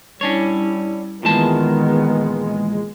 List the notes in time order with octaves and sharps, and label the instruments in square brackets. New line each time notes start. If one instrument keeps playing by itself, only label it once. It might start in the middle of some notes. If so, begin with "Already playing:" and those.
[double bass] G3 E4 [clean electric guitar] C#4 D4 C#5
[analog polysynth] A#1 G#3 [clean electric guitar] A#2 E3 A5 [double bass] D#3 B3